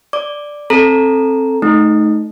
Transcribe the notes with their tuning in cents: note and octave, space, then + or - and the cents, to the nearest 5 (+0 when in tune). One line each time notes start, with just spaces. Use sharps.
D5 +0 D6 +0
C4 +20 A4 +0 A#5 +0
A3 -25 D#4 +0